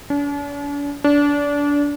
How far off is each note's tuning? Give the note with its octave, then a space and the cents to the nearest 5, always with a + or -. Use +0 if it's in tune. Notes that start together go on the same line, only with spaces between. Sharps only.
D4 -45
D4 -25